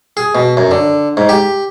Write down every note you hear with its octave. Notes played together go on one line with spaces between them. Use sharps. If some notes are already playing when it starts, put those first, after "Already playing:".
G#4
B2
F#2
D3
G#2
G4